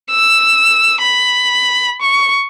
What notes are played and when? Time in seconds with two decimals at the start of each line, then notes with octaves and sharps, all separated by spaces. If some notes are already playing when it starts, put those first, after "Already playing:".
0.11 E6
1.01 B5
2.02 C#6